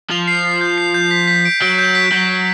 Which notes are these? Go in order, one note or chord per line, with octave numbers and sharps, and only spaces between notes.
F3 F7
C7
C7
G6
C7
G6
B6
B6
D7
F#3 D7
G6
B6
F#3 G6
G6